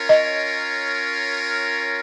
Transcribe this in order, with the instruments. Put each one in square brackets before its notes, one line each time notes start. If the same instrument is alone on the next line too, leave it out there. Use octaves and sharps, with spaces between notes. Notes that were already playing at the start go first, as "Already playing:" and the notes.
Already playing: [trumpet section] C#4 F4 A#4 C#5
[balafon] D#5